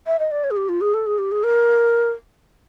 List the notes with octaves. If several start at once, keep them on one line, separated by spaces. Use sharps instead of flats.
E5
D#5
D5
C#5
G#4
G4
F4
G#4
A4
G#4
G4
G#4
A#4